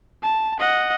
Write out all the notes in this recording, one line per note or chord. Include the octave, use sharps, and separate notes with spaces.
A5
D#5 F#5